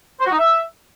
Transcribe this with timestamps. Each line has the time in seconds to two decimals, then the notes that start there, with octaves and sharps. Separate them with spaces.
0.20 C5
0.26 F#4
0.32 D#4
0.38 E5